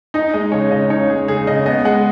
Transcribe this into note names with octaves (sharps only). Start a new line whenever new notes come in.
D#4 D#5
G#3 D#5
C#3 C#5
C#3 D#5
D#4 C#5
G#3 G#4
C#3 G#4
C#3 D#5
B3 D#5
G#3 F#5